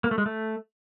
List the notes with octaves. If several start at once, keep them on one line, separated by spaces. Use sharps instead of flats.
A#3
A3
G#3
A3